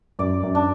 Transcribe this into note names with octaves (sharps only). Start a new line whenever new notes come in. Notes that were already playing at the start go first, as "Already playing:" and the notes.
F#2 D5
F#2
D4